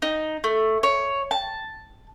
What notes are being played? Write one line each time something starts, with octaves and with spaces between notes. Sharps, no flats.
D#4
A3
C#5
A5